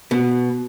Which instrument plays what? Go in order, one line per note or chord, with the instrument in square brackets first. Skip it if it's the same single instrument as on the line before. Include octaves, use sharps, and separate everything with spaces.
[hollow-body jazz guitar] B2